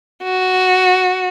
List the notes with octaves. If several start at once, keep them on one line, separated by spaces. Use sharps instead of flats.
F#4